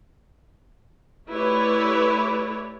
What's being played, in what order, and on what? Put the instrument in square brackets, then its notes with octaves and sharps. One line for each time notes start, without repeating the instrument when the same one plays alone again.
[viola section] A3 E4 G4 B4 C#5 D5